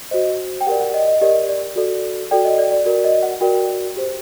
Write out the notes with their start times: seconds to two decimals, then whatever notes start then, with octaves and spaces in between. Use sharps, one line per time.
0.11 F#4 C5 D#5
0.61 G5
0.67 G4 A#4 D5 F#5
0.80 F#5
0.94 D#5
1.08 D#5
1.21 G4 A#4 D5 D#5
1.49 D5
1.76 F#4 A4 D5
2.31 F#4 A4 D5 G5
2.45 D#5
2.58 D5
2.72 D5
2.86 F#4 A#4 D5
3.04 D#5
3.23 F#5
3.41 F#4 A#4 D5 G5
3.96 G4 C5